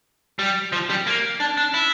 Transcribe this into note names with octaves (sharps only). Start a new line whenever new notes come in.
G3
F3
G3
A#3
D4
D4
E4